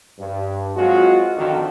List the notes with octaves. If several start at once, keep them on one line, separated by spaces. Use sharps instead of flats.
G2
F#3 G#3 C4 F4 F#4
G#1 F2 D3 D#3 D4 F#4